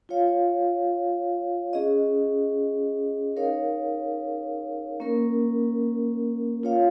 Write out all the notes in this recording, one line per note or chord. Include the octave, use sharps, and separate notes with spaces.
F4 C#5 F5
C#4 G#4 D#5
D#4 A#4 C#5 F5
A#3 C#4 A#4
F4 C#5 F5